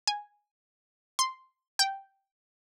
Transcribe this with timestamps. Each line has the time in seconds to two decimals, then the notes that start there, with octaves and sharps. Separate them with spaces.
0.07 G#5
1.19 C6
1.79 G5